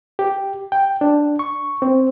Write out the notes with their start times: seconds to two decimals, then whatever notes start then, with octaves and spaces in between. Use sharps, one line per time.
0.19 G4
0.72 G5
1.01 D4
1.39 C#6
1.82 C4